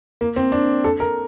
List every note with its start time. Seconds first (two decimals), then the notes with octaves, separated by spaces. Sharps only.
0.21 A#3
0.36 C4
0.52 D4
0.84 A4
1.00 A#4